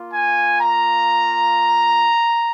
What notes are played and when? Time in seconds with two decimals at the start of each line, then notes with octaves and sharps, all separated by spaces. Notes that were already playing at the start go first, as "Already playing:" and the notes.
Already playing: A#3 F4
0.13 G#5
0.58 A#5